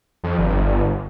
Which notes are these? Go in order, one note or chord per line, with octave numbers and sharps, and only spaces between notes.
F2
G1